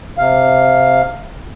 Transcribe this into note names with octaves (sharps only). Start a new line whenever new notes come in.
C3 F5